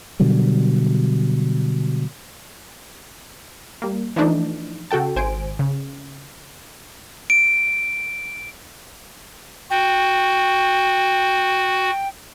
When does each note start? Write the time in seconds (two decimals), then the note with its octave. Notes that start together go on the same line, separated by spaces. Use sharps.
0.20 B2 D3 F#3 G3
3.82 G3 A#3
4.16 E3 F3 A3 D4 D#4
4.91 C#3 F#4 A4 G5 A5
5.16 G#1 C5 G#5 D7
5.59 C#3
7.30 D7
9.70 F#4 G5